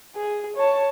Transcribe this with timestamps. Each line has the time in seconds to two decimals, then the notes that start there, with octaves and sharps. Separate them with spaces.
0.16 G#4
0.56 C#5 A5